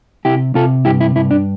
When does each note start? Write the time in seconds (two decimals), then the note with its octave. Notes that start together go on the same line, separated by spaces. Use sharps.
0.25 C3 E4 G4
0.55 C3 F4 A4
0.85 G2 E4 G4
1.01 E4
1.15 G2 E4
1.31 D4